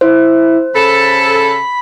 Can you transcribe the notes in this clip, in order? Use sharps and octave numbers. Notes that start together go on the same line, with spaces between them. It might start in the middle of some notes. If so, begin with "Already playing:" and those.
E4 C5
C#3 A4 B5